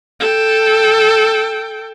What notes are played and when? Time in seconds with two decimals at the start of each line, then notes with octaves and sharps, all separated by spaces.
0.20 A4 G5